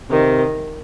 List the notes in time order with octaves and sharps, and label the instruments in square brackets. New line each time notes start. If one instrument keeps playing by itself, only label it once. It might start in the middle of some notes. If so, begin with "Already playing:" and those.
[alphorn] C3 [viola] D#3